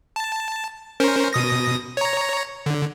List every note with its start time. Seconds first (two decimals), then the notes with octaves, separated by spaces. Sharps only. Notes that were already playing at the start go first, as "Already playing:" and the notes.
0.16 A5
1.00 C#4 A#4 C5
1.33 B2 D#6 A#6
1.97 C#5 A#5
2.66 D3